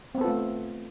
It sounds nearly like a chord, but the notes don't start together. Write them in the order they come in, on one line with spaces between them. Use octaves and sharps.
C4 B3 A4 F4 A3